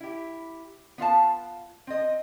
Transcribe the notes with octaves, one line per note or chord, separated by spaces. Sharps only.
E4 G4
B3 F4 F5 A5
C4 D#5